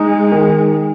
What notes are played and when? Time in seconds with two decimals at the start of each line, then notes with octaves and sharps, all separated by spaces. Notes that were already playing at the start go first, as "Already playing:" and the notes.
Already playing: G#3 D#4
0.32 D#3